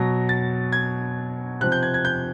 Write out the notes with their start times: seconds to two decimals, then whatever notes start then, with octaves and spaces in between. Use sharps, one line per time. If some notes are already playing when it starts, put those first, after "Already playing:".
Already playing: B2 F#3 A#6
0.29 A6
0.72 G#6
1.60 C3 F3 F#6
1.72 G6
1.83 G#6
1.94 G#6
2.05 G6